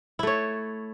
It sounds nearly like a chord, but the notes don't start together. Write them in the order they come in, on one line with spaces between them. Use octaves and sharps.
E4 A3 C#5